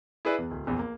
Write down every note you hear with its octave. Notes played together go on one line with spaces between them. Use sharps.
E4 G#4 B4 D5
E2
D1
A#1 E2
A#3